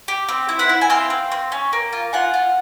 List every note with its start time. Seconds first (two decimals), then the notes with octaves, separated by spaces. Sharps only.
0.08 G4
0.29 C4
0.49 E4
0.59 E5 F#5
0.69 E4
0.81 G#5
0.90 C4 F5 G5
1.10 C4
1.31 C4
1.52 C#4
1.73 A#3
1.93 F4
2.13 F4 F#5 G#5
2.34 F4